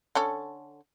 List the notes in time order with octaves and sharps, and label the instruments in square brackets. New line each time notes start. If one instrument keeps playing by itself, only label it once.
[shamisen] D3 C#4 A4